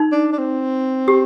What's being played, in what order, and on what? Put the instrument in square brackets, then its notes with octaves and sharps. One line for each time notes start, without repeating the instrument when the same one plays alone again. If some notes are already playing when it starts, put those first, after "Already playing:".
Already playing: [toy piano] D#4
[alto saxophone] D4
D4
C4
[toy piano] G4